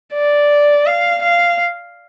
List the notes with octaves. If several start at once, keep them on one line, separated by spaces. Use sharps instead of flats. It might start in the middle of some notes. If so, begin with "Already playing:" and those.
D5
F5
F5